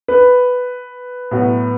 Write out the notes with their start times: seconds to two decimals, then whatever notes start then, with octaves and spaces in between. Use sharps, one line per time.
0.08 B4
1.31 A2 F#3 B3 F#4